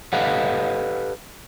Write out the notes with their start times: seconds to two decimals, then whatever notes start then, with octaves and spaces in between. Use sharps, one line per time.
0.13 G4 A4 B4 D#5 F5 F#5